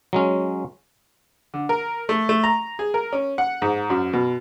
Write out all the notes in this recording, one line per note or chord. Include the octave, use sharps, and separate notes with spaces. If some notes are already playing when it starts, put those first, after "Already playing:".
F#3 G#3 C#4
D3
A#4
A3
A3
A#5
G#4
A#4
C#4
F#5
G#2
F#2
B2